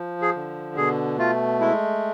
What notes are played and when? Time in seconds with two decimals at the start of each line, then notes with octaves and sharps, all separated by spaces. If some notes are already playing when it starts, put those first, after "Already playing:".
Already playing: F3
0.22 G#4
0.35 D3
0.77 B2 G#4
1.18 A3 F4
1.60 G#3 E4